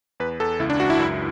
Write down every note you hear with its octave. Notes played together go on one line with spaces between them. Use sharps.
E2 B4
E2 A4
C#2 E4
D4
C#2 F#4
E4
F#2